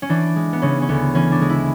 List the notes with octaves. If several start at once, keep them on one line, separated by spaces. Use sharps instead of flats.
C#4
E3 D4
G#3
B3
C#3 C#4
C#4
D2 B3
E3 C#4
D4
G#3
E4